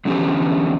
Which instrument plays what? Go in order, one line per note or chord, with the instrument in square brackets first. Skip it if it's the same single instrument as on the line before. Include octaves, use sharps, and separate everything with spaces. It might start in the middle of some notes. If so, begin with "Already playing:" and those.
[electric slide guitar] E2 D3 F3 C#4 G4